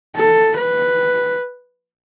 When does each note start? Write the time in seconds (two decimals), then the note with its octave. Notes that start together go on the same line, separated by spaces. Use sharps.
0.16 A4
0.58 B4